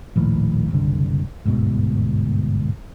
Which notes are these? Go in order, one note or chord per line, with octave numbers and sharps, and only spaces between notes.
A#1 D#2 A2
F#1 C2 D3
G1 D2 G#2 B2